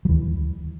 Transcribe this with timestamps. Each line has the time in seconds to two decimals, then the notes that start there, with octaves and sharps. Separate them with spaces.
0.05 F#3
0.09 D#2 E3